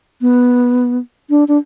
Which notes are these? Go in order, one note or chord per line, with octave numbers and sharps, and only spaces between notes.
B3
D4
D4